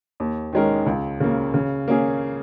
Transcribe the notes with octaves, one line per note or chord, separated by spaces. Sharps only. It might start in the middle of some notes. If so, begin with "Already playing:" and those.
D#2
D#3 G#3 C#4 A#4
C#2
C#3 A#3
C#3
A#3 C#4 G#4